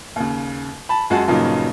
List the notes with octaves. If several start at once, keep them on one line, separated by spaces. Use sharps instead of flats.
D#2 C#3
A5 B5
F#2 G#3 F#4 A5
G2 A#2 C#3 F#3 D#4